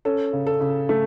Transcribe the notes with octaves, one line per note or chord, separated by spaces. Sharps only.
C#4 A4
C#3
A4
C#3
A3